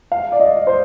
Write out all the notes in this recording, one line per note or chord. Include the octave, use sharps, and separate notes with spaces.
F5
D5
D#5
C5